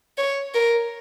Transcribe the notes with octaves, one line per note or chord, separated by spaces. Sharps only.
C#5
A#4